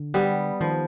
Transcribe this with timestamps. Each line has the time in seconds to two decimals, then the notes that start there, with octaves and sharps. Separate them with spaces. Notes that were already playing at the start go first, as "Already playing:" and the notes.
Already playing: D3
0.14 G3 B3
0.61 D#3 F3